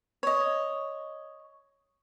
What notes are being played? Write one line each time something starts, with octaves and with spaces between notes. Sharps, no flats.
C#5 D#5